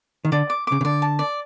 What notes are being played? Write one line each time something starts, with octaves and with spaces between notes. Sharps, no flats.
D#3
D3 D5
D6
C#3 D6
C#3
D3 D5
A5
D5